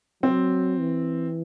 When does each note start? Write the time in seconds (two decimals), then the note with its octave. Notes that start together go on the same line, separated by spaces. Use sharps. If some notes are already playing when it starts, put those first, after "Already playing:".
0.23 F#3 C4
0.79 E3